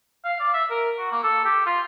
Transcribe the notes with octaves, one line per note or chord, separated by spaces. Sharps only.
F5
D5
E5
A#4
F#4
A#3
A4
G4
F4